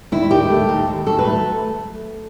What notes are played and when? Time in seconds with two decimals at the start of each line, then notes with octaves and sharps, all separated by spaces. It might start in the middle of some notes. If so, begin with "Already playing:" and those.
0.12 D#2 E4
0.31 D#3 G4
0.50 A3
0.69 D#2
0.87 D#2
1.06 F#3 A4
1.19 B4
1.25 A3